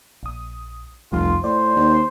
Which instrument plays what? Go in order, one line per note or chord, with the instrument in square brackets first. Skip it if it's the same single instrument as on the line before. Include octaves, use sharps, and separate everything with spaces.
[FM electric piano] A#1 D#6
[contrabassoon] F1 [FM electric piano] C2 F2 C6 [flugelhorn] F4
[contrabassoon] A2 [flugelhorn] C5 [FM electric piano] D5
[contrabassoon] D#2